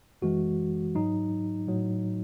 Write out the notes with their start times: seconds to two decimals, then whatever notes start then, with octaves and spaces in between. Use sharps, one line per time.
0.22 F#2 E3 G#3 F#4
0.95 G#2 F#3 D#4
1.68 A2 F#3